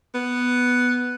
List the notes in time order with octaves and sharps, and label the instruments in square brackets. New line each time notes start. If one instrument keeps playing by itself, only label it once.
[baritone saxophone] B3